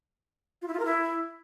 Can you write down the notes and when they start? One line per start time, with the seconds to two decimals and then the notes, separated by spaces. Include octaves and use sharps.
0.62 F4
0.68 E4
0.74 F4
0.79 A#4
0.85 E4